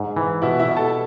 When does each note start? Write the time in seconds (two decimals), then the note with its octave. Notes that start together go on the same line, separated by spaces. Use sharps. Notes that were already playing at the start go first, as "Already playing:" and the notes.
Already playing: G#2
0.16 E3
0.42 B2 E4 E5
0.59 E4 E5
0.68 B2
0.77 A4 A5